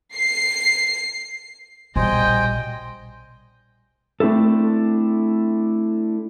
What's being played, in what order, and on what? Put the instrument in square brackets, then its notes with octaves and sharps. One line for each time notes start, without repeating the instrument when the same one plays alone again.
[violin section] C7
[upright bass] A#1 [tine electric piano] B2 G3 [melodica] C5 G#5 [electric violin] D#5 G5
[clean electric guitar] A3 C4 D4 E4 A4